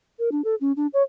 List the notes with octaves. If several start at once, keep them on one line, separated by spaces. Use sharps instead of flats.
A#4
D4
A4
C#4
D4
C#5